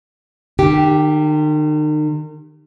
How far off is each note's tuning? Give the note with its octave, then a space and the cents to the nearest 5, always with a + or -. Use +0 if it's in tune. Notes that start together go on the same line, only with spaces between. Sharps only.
D#3 -40 G4 +0